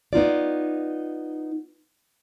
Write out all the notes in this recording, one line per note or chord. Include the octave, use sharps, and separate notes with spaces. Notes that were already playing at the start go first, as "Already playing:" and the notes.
B3 D#4 F4 D5